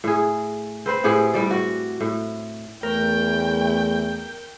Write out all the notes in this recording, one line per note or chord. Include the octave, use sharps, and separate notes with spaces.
A2 G#4
C4 B4 C5
A2 G4 G#4 F#5
A2 G3 D5
F#4
A2
E2 A3 A#4 G5